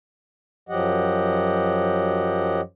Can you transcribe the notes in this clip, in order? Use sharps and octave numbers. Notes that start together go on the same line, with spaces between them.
F#2 F3 F#3 G4 D#5 F#5